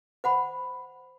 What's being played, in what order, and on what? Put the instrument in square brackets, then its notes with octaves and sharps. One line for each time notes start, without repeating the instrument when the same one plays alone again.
[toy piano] C5 F#5 B5